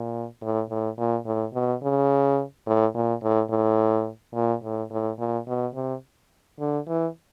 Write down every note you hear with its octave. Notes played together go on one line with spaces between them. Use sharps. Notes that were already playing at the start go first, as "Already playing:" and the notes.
Already playing: A#2
A2
A2
A#2
A2
B2
C#3
A2
A#2
A2
A2
A#2
A2
A2
A#2
B2
C3
D3
E3